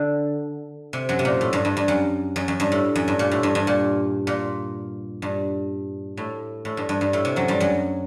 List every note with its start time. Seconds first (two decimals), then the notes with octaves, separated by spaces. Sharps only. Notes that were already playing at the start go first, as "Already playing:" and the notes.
Already playing: D3
0.93 C3
1.09 F#2 F#3
1.19 C3
1.25 A#2
1.41 A2
1.53 G2
1.65 G2
1.77 G2
1.88 F#2
2.36 F#2
2.48 F#2
2.60 G2
2.72 A2
2.96 F#2
3.08 G2
3.19 A#2
3.32 A2
3.43 G2
3.55 G2
3.67 A#2
4.27 A#2
5.22 G2
6.17 A2
6.65 A2
6.77 G2
6.89 G2
7.01 G2
7.13 A2
7.25 C3
7.36 F#2 F#3
7.48 G2 G3
7.60 F#2 F#3